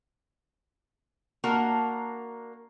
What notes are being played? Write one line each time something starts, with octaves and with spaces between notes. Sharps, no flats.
A#3 D4 F#4 A#4